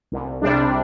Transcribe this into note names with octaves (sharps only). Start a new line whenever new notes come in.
C2
C3 G3 D4